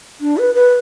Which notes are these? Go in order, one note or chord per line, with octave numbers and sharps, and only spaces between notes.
D4
B4
B4